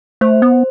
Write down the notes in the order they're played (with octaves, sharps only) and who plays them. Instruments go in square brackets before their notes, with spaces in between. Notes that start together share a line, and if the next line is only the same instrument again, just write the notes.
[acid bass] A3 [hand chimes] C5
[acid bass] B3